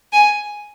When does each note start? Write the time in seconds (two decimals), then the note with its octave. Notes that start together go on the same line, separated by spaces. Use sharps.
0.13 G#5